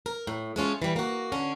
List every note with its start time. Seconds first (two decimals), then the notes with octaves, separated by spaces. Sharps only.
0.06 A#4
0.27 A2
0.56 G#3 A3 C#4 F4
0.82 E3 G3
0.96 A#3 F#4
1.32 D3 C#4